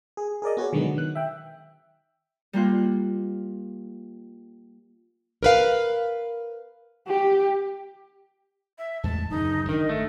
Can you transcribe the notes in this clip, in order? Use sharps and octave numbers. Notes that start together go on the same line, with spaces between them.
G#4
G#4 A#4 D5 D#5
B3 F#4 G#4 C#5
B2 D3 D#3 F#3 G#3 B3
D#3 F#6
E5 G5
G3 A#3 F4 F#6
A#4 B4 F5
G4
E5
E2 A2 G#3 A5
D1 F#2 C#3 D#4
G#1 D#3 D4 D#5
A3